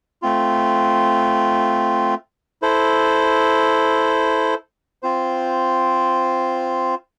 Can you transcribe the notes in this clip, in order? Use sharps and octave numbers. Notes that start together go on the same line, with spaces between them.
A3 C4 F4
E4 A4 C5
C4 F4 C5